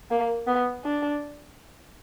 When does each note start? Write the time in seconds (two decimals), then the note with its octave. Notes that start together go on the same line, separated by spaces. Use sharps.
0.11 A#3
0.47 B3
0.84 D4